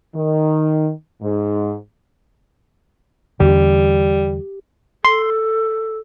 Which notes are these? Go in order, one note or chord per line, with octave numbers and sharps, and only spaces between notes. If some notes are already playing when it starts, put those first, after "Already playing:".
D#3
G#2
E2 D3 G3 G4
A4 C6